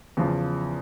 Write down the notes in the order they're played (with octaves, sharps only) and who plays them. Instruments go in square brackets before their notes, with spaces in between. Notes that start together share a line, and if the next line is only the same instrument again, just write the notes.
[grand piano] E2 C#3 F3